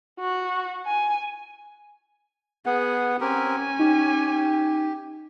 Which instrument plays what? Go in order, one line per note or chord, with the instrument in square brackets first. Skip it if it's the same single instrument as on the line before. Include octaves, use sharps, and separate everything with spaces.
[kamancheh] F#4
G#5
[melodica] B3 F#5 [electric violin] G#4
[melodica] C4 G4 A#4 [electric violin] C#4 G#5
[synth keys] D#4 [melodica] G4